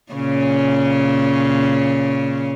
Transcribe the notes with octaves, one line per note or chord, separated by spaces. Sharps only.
A#2 C#3 C#4